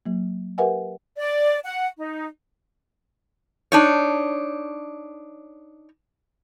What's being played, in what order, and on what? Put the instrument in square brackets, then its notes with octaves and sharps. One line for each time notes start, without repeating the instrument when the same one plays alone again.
[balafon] F#3 A#3
G4 A#4 B4 E5 F#5 G#5
[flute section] D5
F#5
D#4
[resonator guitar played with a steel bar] D4 D#4 C#5